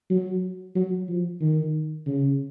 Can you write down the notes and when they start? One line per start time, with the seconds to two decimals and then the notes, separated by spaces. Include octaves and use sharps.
0.10 F#3
0.75 F#3
1.09 F3
1.41 D#3
2.07 C#3